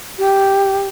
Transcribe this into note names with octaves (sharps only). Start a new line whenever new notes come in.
G4